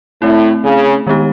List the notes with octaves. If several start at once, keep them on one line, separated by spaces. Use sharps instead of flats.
A2 A3 C4 E4
C#3
D#3 G#3 B3 D#4 G4